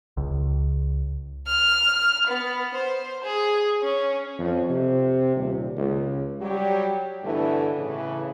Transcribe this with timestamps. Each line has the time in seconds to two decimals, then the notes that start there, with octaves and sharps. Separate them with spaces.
0.17 C#2
1.47 F6
2.27 B3
2.75 C5
3.24 G#4
3.83 C#4
4.39 F2
4.69 C3
5.36 D#1
5.77 C#2
6.40 F#3 G3 G4
7.23 G2 B2 D3 E3 A3 E4
7.75 A2 C#3 E3